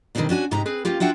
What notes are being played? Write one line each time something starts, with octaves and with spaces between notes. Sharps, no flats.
B2 D#3 E3 G3 C4 D4
C#4 D4 F#4 G#5
G#2 C3 D#4 G4 A#5
C4 G#4 B4
A#3 C#4 F4 G4
D4 F4 F#4 E5 F#5 G5